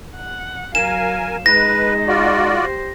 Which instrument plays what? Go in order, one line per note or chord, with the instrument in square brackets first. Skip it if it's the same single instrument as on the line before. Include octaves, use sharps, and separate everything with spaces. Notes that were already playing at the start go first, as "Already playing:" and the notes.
[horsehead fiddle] F#5
[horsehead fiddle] F#3 F5 [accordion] A#4 G#5 [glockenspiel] E7
[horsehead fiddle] G#3 D#4 [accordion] B4 [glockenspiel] A#6
[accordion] F4 F#4 D5
[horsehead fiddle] G4 C5